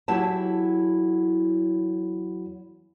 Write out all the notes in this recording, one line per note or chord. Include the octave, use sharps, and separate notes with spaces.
E2 F#3 E4 G4 A5